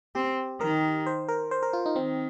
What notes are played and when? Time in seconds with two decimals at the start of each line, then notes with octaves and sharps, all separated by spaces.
0.15 C4 G4
0.61 D#3 A#4
1.06 C5
1.28 A#4
1.51 C5
1.63 A#4
1.73 F4
1.86 D#4
1.96 D#3 C4